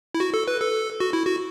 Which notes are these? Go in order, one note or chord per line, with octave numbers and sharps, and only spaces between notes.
E4
F#4
A4
B4
A4
F#4
E4
F#4